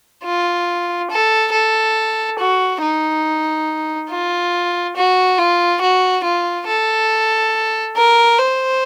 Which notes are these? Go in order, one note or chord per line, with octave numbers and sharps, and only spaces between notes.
F4
A4
A4
F#4
D#4
F4
F#4
F4
F#4
F4
A4
A#4
C5